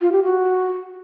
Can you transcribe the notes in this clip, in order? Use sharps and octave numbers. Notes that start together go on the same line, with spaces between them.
F4
G4
F#4